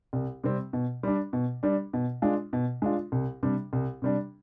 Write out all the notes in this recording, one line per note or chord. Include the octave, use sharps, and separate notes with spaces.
C2
C3 G3 C4
B2
G3 D4
B2
G3 D4
B2
G#3 D4 F4
B2
G#3 D4 F4
C2
C3 G3 D4
C2
C3 G3 D4